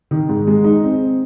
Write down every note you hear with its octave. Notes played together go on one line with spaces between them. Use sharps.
D#3
G#2
G#3
D#4
C4